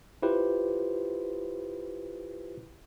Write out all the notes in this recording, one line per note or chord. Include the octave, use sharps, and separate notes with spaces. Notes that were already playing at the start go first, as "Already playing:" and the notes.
E4 F4 G4 B4 C5